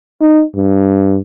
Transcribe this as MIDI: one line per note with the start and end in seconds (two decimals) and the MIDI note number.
0.21 0.43 63
0.55 1.18 43